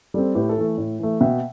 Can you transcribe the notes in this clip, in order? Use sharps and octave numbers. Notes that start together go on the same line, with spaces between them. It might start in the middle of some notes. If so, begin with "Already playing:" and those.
G3 C4 A4
A2 G4 B4
A4
E3 A3
A2
E3 A3
B2 E5 G5